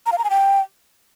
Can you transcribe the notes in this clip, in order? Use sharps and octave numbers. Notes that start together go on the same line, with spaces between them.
A#5
F5
A#5
G#5
G5